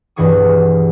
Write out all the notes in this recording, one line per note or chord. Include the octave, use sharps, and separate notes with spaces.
B1 G2 E3 G#4 C#6 D#6